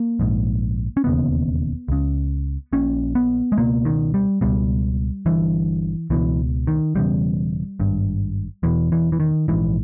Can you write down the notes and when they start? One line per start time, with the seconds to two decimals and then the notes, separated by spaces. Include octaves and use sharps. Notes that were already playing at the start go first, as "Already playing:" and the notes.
Already playing: A#3
0.19 A#1 G#2
0.97 C#4
1.04 E1 D#2 C#3 B3
1.88 C#2 C#3
2.73 A#1 A#2 C#4
3.15 B3
3.52 G#3
3.58 C#2 B2 A#3
3.85 D#3
4.14 G3
4.41 C#2 B2 G3
5.26 G1 G2 E3
6.10 C#2 B2 E3
6.67 D#3
6.95 E1 E2 C#3 G3
7.80 G#1 G2
8.63 E1 E2 B2 E3
8.92 E3
9.12 E3
9.20 D#3
9.48 A#1 G#2 E3